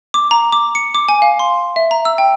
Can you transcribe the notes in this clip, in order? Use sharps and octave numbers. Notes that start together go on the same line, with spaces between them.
D6
A#5
D6
C#7
D6
G#5
F5
C6
E5
A#5
E6
G5